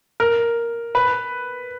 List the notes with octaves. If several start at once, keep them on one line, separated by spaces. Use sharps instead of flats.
A#4
B4